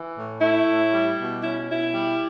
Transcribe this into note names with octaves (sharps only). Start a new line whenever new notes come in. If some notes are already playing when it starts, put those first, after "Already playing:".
Already playing: E3
A2
A3 E4
A2
G3
B2
C#4 E4
B2 E4
G3